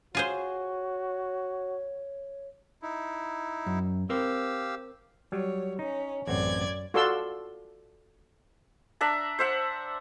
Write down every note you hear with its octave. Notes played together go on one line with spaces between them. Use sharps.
F4 F#4 G#4 C5 C#5
D#4 E4
F#2
C4 G4 A#4 C5 F5 E6
F#3 G3 C#5
C#4 D#4
A1 F#2 C4 D5 F#5 G#6
F4 F#4 A4 D5 C6 E6
D4 E5 A#5
C5 E5 F#5